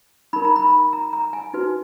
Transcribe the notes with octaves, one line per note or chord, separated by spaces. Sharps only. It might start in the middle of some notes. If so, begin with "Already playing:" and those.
D#4 A#4 B5
A#5
B5
A#5
A#5
G#5
D#4 F#4 B4